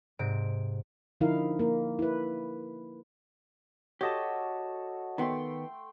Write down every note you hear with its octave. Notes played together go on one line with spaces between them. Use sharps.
G#2 C3 D7
D3 F3 D#4 E4 A#4 F5
A#3 A#4
E4 B4
F#4 G4 A4 C#5 D#5 A5
D#3 A3 B3 G5 C6